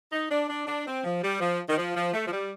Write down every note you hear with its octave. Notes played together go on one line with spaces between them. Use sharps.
D#4
D4
D4
D4
C4
F3
G3
F3
D#3
F3
F3
A3
F3
G3